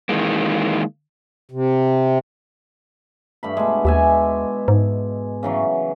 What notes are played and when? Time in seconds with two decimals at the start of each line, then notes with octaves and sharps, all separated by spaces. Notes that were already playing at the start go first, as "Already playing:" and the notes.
0.09 D#3 E3 G#3 A#3
1.52 C3
3.43 G2 A3 B5
3.57 B2 G#3
3.85 D#2 D5 E5 G#5
4.68 G#2
5.43 C#3 E3 F#3